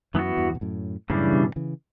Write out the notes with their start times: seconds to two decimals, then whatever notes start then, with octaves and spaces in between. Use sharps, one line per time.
0.14 F#2 E3 B3 F#4
0.37 E2 G2
0.55 B2
0.61 F#2 A2
1.10 F#2 A2 C#3 E3 G3 D4
1.33 G2 B2
1.56 C#3 E3